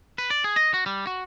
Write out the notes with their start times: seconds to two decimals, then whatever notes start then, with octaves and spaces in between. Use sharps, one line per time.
0.18 B4
0.30 D5
0.44 G#4
0.56 D#5
0.74 F#4
0.86 G3
1.07 F#4